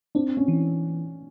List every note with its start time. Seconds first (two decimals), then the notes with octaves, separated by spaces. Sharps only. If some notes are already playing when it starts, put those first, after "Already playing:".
0.15 C4 D4
0.37 C#4
0.48 E3